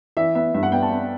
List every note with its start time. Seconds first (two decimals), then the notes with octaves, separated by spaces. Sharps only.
0.17 E3 E5
0.35 B3 E5
0.54 G2 E5
0.63 F#5
0.72 B3 G5
0.82 A5
0.91 B3